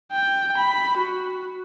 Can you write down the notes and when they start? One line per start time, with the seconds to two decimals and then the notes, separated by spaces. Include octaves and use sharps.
0.12 G5
0.58 B5
0.98 F#4